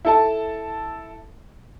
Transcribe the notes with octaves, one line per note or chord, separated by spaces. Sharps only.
E4 A4 A5